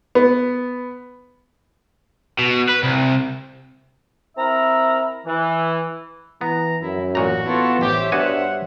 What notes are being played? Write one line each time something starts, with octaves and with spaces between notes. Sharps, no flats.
B3
B2
B4
C2
C4 E4 A#4 E5 A#5
E3
E3 B3 A#5
F#2 E4
A1 A#2 F#4 A#5
B3 E4 F4 A4
A1 G4 C5 C#5 E5
G2 B3 F#4 F#5 G#5